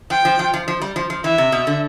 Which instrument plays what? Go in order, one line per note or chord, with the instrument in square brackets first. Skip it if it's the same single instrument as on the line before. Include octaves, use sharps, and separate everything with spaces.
[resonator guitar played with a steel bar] F3 [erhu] G5
[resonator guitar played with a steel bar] F3
F3
F3
F3
G3
F3
F3
[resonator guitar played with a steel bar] E3 [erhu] E5
[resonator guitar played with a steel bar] C3
B2
D3